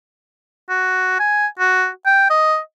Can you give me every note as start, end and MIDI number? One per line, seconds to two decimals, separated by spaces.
0.70 1.16 66
1.20 1.47 80
1.59 1.88 66
2.06 2.29 79
2.30 2.58 75